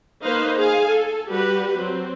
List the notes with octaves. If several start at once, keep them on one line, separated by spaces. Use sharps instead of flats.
A#3 D#4 B4 C5 F5
G#4 F5 G#5
A4
G3 F#4 G4 B4
F#3 C4